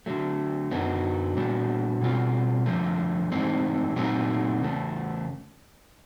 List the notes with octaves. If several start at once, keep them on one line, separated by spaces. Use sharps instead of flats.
D3 F#3 A3
F#2 D3 F#3 B3 D#4
A#2 G3 B3 D4 F#4
B2 G3 C4 F4
D3 F3 A3
G#2 E3 A3 C4 D#4
A#2 F#3 A3 C4 D#4
E2 C#3 A3